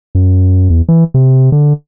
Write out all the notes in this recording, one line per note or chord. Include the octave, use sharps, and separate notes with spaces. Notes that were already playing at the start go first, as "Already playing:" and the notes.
F#2
E2
E3
C3
D3